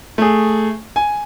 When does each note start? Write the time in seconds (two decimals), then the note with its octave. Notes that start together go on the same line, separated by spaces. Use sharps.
0.18 A3 G#4
0.96 G#5